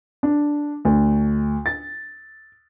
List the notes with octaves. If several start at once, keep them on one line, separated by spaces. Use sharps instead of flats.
D4
D2
A6